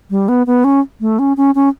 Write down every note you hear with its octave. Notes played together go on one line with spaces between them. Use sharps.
G3
B3
B3
C#4
A3
C#4
C#4
C#4